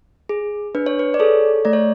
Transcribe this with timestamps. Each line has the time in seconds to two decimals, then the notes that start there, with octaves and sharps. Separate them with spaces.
0.29 G#4
0.75 D4 B4
0.86 C#5
0.99 B4
1.14 D5
1.19 G#4 A4 C#5
1.65 A3 D5
1.73 C#5